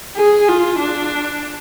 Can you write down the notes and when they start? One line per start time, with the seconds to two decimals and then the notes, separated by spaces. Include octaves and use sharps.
0.16 G#4
0.48 F4
0.79 D4